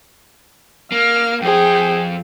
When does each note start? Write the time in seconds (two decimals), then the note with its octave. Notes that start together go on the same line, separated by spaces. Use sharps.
0.92 A#3 F6
1.42 F2 G#4 C5 G5